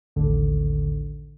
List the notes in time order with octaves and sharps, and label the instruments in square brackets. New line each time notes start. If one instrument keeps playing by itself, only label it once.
[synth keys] A1 D#2 D3